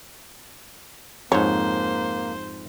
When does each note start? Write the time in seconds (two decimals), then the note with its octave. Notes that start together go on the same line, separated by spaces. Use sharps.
1.32 F2 G#2 A#3 C5 C#5